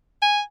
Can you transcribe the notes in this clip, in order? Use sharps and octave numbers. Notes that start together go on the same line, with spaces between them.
G#5